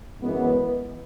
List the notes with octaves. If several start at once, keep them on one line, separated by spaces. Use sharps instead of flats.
F#2 E3 G#3 B3